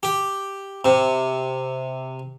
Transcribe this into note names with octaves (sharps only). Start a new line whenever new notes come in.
G4
C3